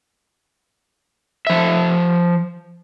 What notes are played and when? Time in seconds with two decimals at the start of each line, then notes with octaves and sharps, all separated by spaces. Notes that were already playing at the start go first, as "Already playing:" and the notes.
1.47 F3 E5